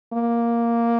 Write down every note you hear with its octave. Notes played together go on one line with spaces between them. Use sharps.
A#3